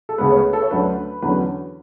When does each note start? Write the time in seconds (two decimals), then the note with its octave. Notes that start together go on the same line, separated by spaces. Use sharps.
0.09 A4
0.18 D2 C#3 G#3 B3 B4
0.31 C#5
0.36 B4
0.53 A4
0.62 C#5
0.71 D2 D3 F#3 A3 C#4 B4
1.22 E2 D3 F#3 C#4 B4